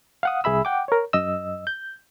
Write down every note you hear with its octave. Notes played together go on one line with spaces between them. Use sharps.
F5 F#5 D#6
C2 G#4 E5 B5 E6
F#5 G5 D6
A#4 C#5
F#2 D#5 E6
G6